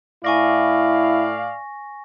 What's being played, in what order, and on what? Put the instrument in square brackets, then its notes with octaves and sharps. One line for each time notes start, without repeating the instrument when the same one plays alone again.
[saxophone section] A2 D5 F5 [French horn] E4 [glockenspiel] G#5 C#6 A#6